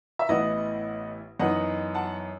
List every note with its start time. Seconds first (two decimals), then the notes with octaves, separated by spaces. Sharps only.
0.19 E5
0.29 A1 A2 E3 B3 E4 D#5 F#5
1.40 F#2 E3 B3 D#4 D#5 F#5
1.94 F#5 A5